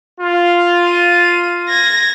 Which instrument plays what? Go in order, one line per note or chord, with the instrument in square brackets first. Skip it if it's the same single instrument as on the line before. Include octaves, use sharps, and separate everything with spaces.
[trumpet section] F4
[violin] D#7
G#6 A#6